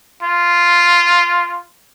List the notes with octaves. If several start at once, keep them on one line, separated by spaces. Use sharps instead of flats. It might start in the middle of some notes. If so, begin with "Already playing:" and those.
F4